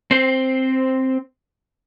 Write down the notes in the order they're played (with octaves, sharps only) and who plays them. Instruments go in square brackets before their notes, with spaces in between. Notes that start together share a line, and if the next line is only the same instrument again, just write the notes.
[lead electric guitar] C4 C5